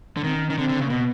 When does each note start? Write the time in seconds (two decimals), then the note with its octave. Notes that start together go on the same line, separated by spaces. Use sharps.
0.17 D3
0.24 D#3 C4
0.35 C#4
0.47 C#4
0.50 D#3
0.58 D3 C4
0.69 D3
0.80 C#3
0.85 A#3
0.90 B2 B3